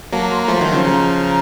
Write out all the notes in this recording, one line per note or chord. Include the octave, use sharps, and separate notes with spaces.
F#3 A#3 A5
A#5
C6
A#5
F3 A3 C6
D#3 F#3
C#3 F3
C#3 F3 A#5
A#5